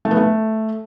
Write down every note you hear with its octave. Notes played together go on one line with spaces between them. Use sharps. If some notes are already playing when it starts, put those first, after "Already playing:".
A3
B3
A3